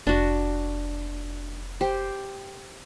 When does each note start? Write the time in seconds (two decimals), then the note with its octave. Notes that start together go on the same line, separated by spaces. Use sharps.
0.07 F1 D4 F#4
1.81 G4 C5